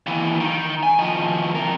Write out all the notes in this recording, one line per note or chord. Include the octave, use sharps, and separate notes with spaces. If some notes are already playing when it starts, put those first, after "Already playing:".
D#2 E3
D#3
G#5
D#3 F3
C3 A#4